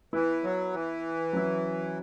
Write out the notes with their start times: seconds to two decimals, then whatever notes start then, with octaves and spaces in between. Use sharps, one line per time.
0.13 E3 B3 E4 B4
0.44 F#3
0.73 E3
1.33 F#3 C#4 E4